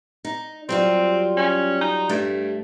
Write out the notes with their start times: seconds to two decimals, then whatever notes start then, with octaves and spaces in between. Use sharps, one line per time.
0.25 D#4
0.69 F#3 G3 C4 F4
1.37 C#4
1.81 D#4
2.09 G2 A3